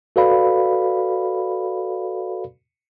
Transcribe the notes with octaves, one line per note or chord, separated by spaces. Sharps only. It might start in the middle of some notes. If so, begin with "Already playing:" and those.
F#4 A4 B4 D5 F5 B5